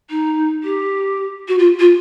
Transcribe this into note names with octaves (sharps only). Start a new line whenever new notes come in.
D#4
G4
F#4
F4
F4